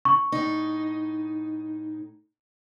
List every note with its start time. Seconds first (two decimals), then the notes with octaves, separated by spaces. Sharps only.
0.05 C#6
0.32 A2 D#4